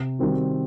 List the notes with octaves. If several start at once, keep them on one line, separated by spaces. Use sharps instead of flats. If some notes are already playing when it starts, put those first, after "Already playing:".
Already playing: C3
D#3 G3 C4 F#4